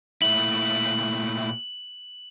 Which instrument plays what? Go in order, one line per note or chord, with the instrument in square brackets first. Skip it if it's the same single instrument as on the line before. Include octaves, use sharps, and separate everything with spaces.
[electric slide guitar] A#2 A3 E4 [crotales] F#7